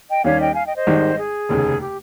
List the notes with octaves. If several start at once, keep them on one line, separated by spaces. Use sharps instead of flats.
D#5 G5
D#2 D#3 G3 C#4 G4 C#5 F5
D#5 G5
F5 G#5
D#5 G5
C5 D#5
G#1 G#2 D#3 G3
G#4
F1 D#2 C#3
G4